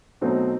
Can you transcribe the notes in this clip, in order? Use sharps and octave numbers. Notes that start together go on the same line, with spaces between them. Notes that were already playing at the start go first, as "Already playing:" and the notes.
B2 F#3 A3 C4 D#4